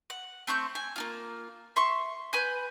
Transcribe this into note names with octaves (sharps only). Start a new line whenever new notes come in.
F#5
A3 C4 C#6 G6
G#5
A#3 D4 F4
E5 C6 C#6
B4 G#5 G6